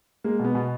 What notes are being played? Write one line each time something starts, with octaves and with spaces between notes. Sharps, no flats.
G#3 A#3
B2
B3
B2